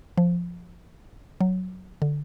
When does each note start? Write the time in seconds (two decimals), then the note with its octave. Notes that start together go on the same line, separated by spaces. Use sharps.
0.18 F3
1.41 F#3
2.02 D3